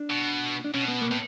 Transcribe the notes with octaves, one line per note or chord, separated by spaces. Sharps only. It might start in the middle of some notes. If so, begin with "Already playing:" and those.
Already playing: D4
B2
D4
B2 C#4
B3
A#3
A2 B3